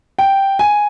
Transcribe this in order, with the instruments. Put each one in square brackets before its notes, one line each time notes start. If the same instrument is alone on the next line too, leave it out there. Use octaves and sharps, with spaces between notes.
[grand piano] G5
G#5